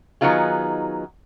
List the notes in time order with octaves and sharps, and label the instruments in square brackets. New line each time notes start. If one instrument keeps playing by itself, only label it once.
[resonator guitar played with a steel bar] D#3 F#3 B3 D#4 F4 G#4